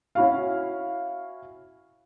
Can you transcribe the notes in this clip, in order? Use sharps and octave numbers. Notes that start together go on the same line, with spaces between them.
C#4 E4 F#4 F5